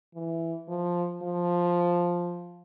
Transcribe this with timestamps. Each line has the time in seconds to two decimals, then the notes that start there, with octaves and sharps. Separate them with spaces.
0.15 E3
0.68 F3
1.23 F3